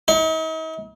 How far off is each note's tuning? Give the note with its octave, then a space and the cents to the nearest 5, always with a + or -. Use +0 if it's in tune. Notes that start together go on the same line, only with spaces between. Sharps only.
D#4 +45